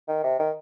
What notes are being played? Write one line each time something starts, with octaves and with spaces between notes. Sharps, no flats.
D#3
C3
D#3